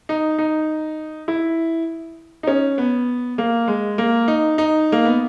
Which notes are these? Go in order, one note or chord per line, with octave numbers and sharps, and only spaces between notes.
D#4
D#4
E4
D#4
C#4
B3
A#3
G#3
A#3
D#4
D#4
A#3
B3